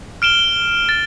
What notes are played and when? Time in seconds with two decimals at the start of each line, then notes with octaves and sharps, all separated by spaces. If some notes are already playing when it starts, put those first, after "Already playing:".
0.22 F6 D7 E7 G7
0.89 A6